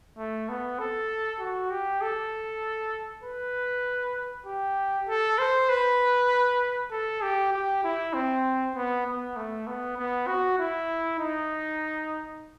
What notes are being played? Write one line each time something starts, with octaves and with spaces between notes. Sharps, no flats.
A3
B3
A4
F#4
G4
A4
B4
G4
A4
C5
B4
A4
G4
G4
E4
C4
B3
B3
A3
B3
B3
F#4
E4
D#4